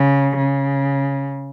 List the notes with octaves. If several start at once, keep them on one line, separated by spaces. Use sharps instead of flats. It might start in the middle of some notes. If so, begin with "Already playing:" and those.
Already playing: C#3
C#3